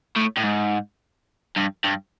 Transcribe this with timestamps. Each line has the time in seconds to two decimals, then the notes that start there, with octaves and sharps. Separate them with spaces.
0.17 A2
0.38 A2
0.44 G#2
1.56 G2
1.84 G2